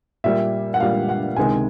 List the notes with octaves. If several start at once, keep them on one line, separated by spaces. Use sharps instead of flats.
A#2 G3 E5
F#5
A#2 G3 F5
F#5
C#2 C3 D#3 G#3 G#5